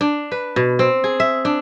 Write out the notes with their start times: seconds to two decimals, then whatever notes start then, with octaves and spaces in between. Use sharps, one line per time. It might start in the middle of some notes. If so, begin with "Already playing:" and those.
0.01 D4
0.32 B4
0.56 B2
0.79 C4
1.04 G#4
1.20 E5
1.45 D4